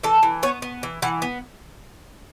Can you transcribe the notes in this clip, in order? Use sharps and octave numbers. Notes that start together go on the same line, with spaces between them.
E3 A4
E3
B3 C#5
B3
E3
E3 F#5
B3